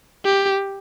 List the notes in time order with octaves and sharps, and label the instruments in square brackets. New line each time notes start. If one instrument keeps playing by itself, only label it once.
[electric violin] G4